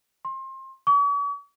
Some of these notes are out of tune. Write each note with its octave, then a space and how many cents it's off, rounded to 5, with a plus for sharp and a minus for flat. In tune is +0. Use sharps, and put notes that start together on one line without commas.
C6 +30
C#6 +45